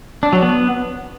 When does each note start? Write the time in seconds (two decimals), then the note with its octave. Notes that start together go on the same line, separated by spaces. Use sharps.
0.23 D4
0.33 F#3
0.42 B3